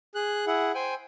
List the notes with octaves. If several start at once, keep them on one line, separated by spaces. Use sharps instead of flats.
G#4 F#6
E4 G#4 F#5
C5 G5 G#5